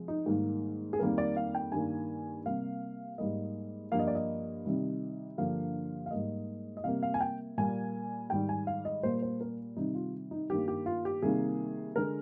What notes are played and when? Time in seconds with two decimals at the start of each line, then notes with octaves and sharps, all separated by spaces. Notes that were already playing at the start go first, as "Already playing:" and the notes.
Already playing: C3 F3 G#3
0.08 D#4
0.26 G#2 D#3 G3 A#3
0.93 G#4
0.99 F2 D#3 G3 A#3 A#4
1.18 D5
1.36 F5
1.55 G5
1.72 G2 D#3 A#3 G#5
2.46 C3 G3 A#3 F5
3.18 G#2 G3 A#3 D#5
3.92 G2 F3 A#3 F5
3.99 D#5
4.08 D5
4.15 D#5
4.65 C3 D#3 G3
5.37 G2 D3 F3 A#3 F5
6.06 F5
6.11 G#2 G3 A#3 D#5
6.77 D#5
6.84 C3 G3 A#3 F5
7.03 F5
7.14 G#5
7.21 G5
7.58 A#2 G3 A#3 G#5
8.30 G#2 D#3 G3 G5
8.49 G#5
8.67 F5
8.85 D#5
9.03 A#2 G3 A#3 C5
9.22 C5
9.41 A#4
9.77 C3 D#3 G3 D#4
9.95 F4
10.31 D#4
10.50 G2 D#3 A#3 G4
10.68 G4
10.86 F4
11.05 G4
11.22 C3 D#3 G3 A#3 G#4
11.96 D3 G#3 A#4